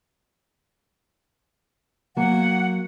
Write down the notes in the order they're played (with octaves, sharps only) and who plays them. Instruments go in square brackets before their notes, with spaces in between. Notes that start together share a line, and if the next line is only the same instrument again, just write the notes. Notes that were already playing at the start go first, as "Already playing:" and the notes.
[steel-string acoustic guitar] F#3 A#3 [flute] F#5